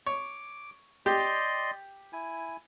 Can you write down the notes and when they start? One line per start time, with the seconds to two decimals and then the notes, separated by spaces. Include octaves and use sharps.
0.06 C#5 D6
1.06 G4 D5 D#5 C6
2.13 E4 G#5